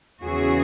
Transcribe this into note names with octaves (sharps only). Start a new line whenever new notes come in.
E2 C#3 E3 F#4 G#4